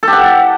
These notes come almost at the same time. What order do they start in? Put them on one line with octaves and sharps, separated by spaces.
A4 G4 F#5